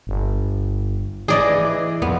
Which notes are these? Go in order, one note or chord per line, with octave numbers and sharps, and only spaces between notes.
G1
E3 G#4 D5 D#5
F2 B3